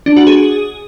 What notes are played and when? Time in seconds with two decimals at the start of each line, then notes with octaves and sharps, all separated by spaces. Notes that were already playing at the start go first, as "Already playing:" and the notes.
0.06 D4
0.16 F#4
0.27 G#4